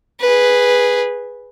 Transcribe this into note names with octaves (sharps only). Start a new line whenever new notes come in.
G#4 B4